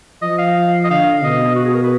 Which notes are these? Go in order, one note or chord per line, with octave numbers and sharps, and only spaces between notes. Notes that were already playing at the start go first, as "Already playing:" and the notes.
F3 D#5
F5
D#5
D3 F5
B2 D#5
F#4
G#4
A#4
B4